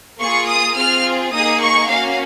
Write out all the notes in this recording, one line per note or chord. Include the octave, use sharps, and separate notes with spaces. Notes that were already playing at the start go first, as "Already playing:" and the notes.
A#3 F4 G#4 C#6
D#6
C4 F4 G#4 F6
A#3 D#4 G#4 D#6
C#6
A#3 C#4 F#4 F5